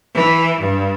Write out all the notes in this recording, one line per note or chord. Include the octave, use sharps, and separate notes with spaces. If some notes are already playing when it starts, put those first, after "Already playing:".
E3
G2